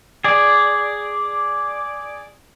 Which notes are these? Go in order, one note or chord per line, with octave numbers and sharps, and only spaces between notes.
G#4 D5